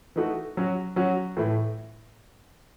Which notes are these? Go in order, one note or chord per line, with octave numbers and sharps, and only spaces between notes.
E3 A3 D#4 F#4
F#3 C#4 F#4
F#3 C#4 F#4
A2 E3 A3 E4